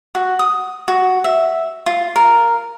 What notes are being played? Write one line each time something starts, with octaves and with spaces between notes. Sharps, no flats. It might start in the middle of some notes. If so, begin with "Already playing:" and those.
F#4
D#6
F#4
E5
F4
A#4